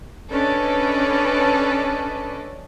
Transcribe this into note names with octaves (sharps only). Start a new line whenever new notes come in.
C#4 D4 A4 B4 D5 D#5